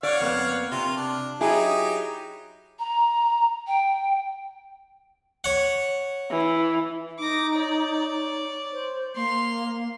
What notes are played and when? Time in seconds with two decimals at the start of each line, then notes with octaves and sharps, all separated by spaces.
0.03 C#5 D5 F5 F#5
0.21 F2 A#3 B3
0.71 C3 F4
0.97 D4
1.41 F#3 D#4 E4 G4 G#4
2.79 A#5
3.67 G5
5.44 C#5 F#5
6.30 E3
7.19 D#4 D6 A#6
7.53 C#5 D5
8.73 C5
9.16 A#3 C6 F7